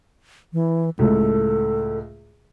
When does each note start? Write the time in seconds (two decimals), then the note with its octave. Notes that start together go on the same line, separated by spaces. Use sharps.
0.53 E3
0.99 C#2 A2 A4